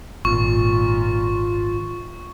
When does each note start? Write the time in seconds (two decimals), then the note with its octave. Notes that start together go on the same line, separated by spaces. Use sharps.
0.25 G#1 A#2 F4 C#6